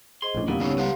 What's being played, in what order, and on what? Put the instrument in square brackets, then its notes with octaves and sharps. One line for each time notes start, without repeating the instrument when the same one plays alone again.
[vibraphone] G#4 C5 D#5 [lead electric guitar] C6
[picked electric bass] A#1 A2 [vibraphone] C#4 D4
[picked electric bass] D#2 A#2 G3 [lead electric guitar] F#3 B3 [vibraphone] A#3 E4 F5
[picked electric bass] C#2 G3 [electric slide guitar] G2 C4 C#4 [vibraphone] D#4 C#5
[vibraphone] G4 C6 [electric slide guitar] B4 F5 F#5